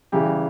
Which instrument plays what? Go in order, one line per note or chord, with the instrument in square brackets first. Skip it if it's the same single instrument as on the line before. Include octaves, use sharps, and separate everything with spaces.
[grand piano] E2 C#3 E3 [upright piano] G4